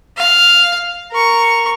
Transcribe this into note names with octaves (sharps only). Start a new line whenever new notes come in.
F5
A#4 C#6